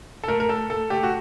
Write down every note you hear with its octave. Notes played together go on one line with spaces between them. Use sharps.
A4
A3 A#4
A#4
A3 A4
A3 A4
A3 G4
F#4